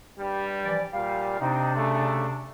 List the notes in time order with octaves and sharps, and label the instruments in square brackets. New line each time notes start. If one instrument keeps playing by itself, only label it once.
[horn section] G2 G3
[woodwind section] E3 F3 D5
[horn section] A#2 G3 [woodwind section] F5
[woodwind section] C3 D4 [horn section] C4 D#4
[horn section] C#3 A3